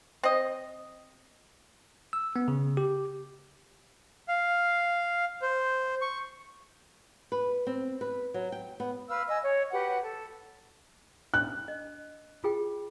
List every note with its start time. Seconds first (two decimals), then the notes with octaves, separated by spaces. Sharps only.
0.23 C4 D#5
2.13 E6
2.36 B3
2.48 C#3
2.77 G4
4.28 F5
5.42 C5
6.01 C#6
7.32 B4
7.67 C4
8.01 B4
8.34 F#3
8.52 G5
8.80 B3
9.09 B4 F5 E6 F6
9.28 D#5 G#5 E6
9.43 C#5
9.71 F#4 G4 B4 F#5
10.01 A4
11.34 D4 F#6
11.68 D#5
12.44 F4 G#4 G5